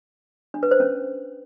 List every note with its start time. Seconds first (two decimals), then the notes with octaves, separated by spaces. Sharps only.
0.54 D4
0.63 B4
0.71 C5
0.80 C#4